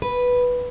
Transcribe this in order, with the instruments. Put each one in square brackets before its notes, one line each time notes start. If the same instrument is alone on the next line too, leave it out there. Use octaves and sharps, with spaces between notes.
[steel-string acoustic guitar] B4